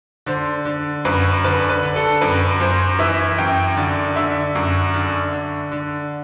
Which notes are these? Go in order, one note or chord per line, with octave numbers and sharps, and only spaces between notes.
D3 C5
D3
F#2 B4
D3 B4
B4
D3
A4
F#2 B4
F#2 C5
E3 E5
F#2 G5
D3
D3 E5
F#2
D3
D3
D3